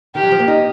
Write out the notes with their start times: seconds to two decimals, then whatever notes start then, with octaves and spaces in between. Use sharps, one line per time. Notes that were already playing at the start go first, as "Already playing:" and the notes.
0.15 D#3 G4
0.23 F#3
0.31 F3
0.39 A#3
0.48 D#4